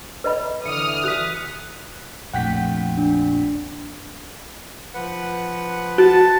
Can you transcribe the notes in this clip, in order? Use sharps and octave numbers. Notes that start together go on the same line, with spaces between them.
B4 D#5 B5
D3 E3 D#6 F6 C#7
F#4 F#6 B6
A#1 F2 A3 F#5 G5 B6
D4
F3 B4 F#5
F#4 A5